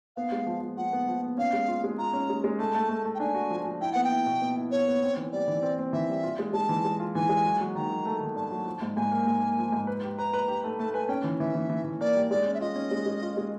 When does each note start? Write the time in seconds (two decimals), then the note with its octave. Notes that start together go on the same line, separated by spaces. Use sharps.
0.16 B3 F5
0.32 G#3
0.46 F3
0.62 F3
0.77 F3 F#5
0.93 B3
1.08 F3
1.23 B3
1.37 C#4 F5
1.53 G#3
1.68 F4
1.84 G#3
1.98 F4 A#5
2.13 C#4
2.30 G#3
2.44 G#3
2.59 A3 A5
2.75 A3
2.89 A3
3.05 A3
3.15 G5
3.20 D4 G#5
3.35 F#4
3.50 F3
3.65 F3
3.81 E4 G5
3.93 B3 F#5
4.04 G5
4.11 E4
4.26 B2
4.41 B3
4.56 E4
4.71 B3 C#5
4.88 B3
5.03 C4
5.17 E3
5.32 G3 D5
5.48 E3
5.63 C4
5.79 C4
5.93 E3 E5
6.09 G3
6.23 F4
6.39 G#3
6.53 G#3 A5
6.69 E3
6.85 G#3
7.00 F4
7.15 E3 G#5
7.29 G#3
7.45 F#3
7.60 F#3
7.75 D#3 A#5
7.91 F#3
8.06 A3
8.21 D#3
8.35 G2 A5
8.51 F#3
8.66 F3
8.82 G#2
8.96 G#2 G#5
9.12 A#3
9.27 G#2
9.42 A#3
9.58 F3
9.72 G#2
9.87 B4
10.03 G4
10.18 B4 A#5
10.34 B4
10.48 G4
10.64 A3
10.79 A3 A5
10.94 B4 G#5
11.09 C#4 G5
11.24 E3
11.40 E3 E5
11.55 E3
11.70 E3
11.84 E3
12.01 A#3 D5
12.15 G3
12.30 G#3 D5
12.46 C#4
12.54 E5
12.61 F4 D#5
12.76 C#4
12.91 G#3
13.06 G#3
13.22 F4
13.37 G#3